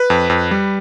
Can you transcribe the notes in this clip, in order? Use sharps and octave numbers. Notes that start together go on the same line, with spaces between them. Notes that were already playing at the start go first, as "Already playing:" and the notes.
Already playing: B4
F2
F2
G3